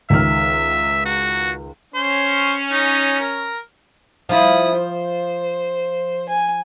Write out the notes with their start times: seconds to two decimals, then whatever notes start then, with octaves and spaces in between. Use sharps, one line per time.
0.10 C#2 D#3 E5 F6
1.06 F#4
1.94 C#4 C5
2.72 D#4
3.19 A#4
4.29 F3 E4 F4 D#6
4.75 C5
6.29 G#5